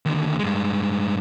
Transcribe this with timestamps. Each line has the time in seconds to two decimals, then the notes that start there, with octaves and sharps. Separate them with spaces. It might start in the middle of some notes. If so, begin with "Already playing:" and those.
0.06 D#2 D3
0.39 G2 G#3